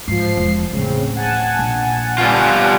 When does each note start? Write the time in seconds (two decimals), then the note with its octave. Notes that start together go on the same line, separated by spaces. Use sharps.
0.08 G#2 F3 C7
0.37 E1
0.73 D1 A1 C#3 C4
1.16 F#5 G#5 A5
1.59 A#1
2.18 G3 B3 F4